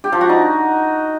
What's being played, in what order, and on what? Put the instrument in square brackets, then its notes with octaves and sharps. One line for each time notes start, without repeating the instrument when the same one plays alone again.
[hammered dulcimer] G4
F3
F#4
D#4